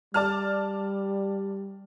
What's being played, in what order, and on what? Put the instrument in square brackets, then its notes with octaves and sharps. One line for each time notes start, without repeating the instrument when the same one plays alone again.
[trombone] G3 [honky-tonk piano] D5 A5 F6